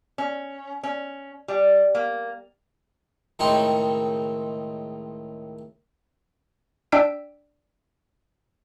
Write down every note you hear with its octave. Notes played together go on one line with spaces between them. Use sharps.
C#4
C#4
G3
A#3
C#2 A2 D#3 C4 D#4 C#6
D4 D5 G5 E6 B6 D7